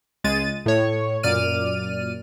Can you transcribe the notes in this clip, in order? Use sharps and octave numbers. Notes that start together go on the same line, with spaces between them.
C#2 G#3 A6 D#7
A2 C#5
F#2 A#2 D5 F6 D#7